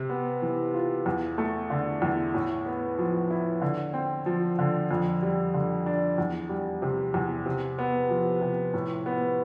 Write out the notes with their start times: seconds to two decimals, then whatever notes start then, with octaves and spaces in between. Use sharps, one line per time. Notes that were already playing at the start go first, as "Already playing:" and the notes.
Already playing: C3
0.10 B3
0.42 E3
0.74 F4
1.06 E2
1.38 A3
1.70 D3
2.02 E2
2.34 A2
2.66 B3
2.99 F3
3.31 E4
3.61 D3
3.93 C4
4.26 F3
4.59 D3
4.91 F2
5.22 G3
5.54 D3
5.86 D4
6.18 E2
6.49 G3
6.82 C3
7.14 E2
7.46 C3
7.79 B3
8.09 F3
8.41 C3
8.74 A2
9.06 B3